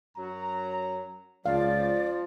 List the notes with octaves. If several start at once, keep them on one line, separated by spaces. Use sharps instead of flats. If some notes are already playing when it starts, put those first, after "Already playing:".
F#2 F#3 A#5
C#2 F3 D5 F5